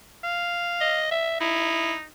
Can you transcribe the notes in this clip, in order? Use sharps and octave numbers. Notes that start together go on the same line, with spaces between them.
F5
D#5
E5
D#4 E4